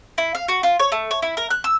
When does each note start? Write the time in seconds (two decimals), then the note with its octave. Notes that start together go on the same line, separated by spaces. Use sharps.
0.18 E4
0.35 F5
0.48 F#4
0.63 F4
0.79 C#5
0.92 A3
1.11 C#5
1.22 E4
1.37 A#4
1.50 F#6
1.64 E6